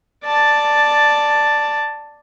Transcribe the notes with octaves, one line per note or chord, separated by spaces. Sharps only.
D5 A5